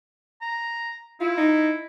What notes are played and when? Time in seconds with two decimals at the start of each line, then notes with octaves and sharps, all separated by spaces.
0.42 A#5
1.20 E4 F4
1.37 D#4